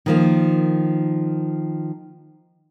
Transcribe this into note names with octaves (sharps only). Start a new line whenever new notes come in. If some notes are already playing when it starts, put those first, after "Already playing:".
D#3 F3 A#3